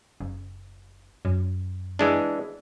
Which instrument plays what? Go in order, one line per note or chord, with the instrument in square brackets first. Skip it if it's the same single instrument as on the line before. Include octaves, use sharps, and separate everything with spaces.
[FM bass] F#1
F#2
[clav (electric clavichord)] E3 G#3 D4